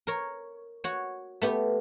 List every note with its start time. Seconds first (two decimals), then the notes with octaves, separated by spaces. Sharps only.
0.07 A#4 C#5
0.84 F#4 C#5
1.42 A3 B3 G4